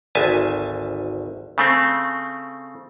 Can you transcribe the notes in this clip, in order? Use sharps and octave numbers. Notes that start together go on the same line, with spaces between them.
G#1 D2 E5 G#5 A5
C#3 A3 C4